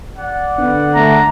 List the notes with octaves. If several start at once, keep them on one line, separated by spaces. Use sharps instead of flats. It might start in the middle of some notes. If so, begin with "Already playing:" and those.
D5 F#5
D3 B3
A3 A#5